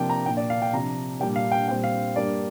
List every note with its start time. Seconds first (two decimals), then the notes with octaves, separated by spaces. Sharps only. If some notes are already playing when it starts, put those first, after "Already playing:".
Already playing: C3 F3 A#3 D4 G5
0.10 A#5
0.26 A#2 A#3 D4 G5
0.37 D5
0.50 F5
0.62 G5
0.73 C3 F3 D4 A#5
1.20 A#2 G3 D4 G5
1.36 F5
1.52 G5
1.68 A#2 G3 C4 G5
1.84 F5
2.16 G2 G3 A#3 D4 D5